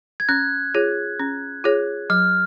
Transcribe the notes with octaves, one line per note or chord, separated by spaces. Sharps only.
G#6
C#4 F#6
F4 G#4 C#5
C#4
F4 G#4 C#5
F#3 F6